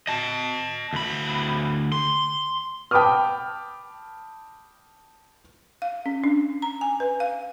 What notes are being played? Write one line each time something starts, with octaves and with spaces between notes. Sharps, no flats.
D#5 A5
D2 B5
C6
G5 A5 B5 D6 D#6 F6
F5
C#4
D4
A#5
G#5
B4
F5